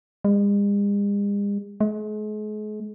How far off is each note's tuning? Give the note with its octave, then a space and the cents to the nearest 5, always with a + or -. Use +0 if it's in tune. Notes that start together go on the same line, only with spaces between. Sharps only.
G#3 -45
G#3 +40